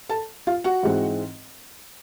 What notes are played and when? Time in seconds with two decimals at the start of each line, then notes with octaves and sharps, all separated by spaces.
0.09 A4 A5
0.47 F4 F5
0.64 F#4 F#5
0.83 G#2 E3 G#3 C4